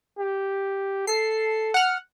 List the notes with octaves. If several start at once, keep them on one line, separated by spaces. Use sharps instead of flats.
G4
A4 C7
F#5 F6